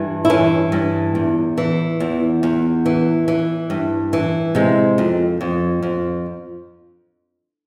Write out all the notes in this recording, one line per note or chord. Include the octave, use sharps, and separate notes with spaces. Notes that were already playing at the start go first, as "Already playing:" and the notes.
Already playing: G2 E3
E4
E3 C#4
G2
E2
E3
E2
E2
E3
E3
G2
E3
C3 G#3
F2
F2
F2